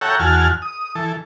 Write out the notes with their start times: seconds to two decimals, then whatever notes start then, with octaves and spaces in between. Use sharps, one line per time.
0.01 A4 C#5 E5 F#5 G5 A#5
0.19 E2 F#4 G#5 A5 F6
0.62 D#6
0.95 E3 A4